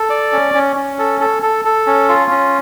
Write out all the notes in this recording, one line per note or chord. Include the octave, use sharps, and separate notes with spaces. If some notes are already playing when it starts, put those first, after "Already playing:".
Already playing: A4
D5
C#4
C#4
C#4
A4
A4
A4
A4
C#4
F4
C#4